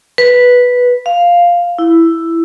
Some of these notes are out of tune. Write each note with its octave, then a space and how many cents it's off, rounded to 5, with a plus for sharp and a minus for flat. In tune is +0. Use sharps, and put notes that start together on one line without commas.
B4 -5
F5 +0
E4 +5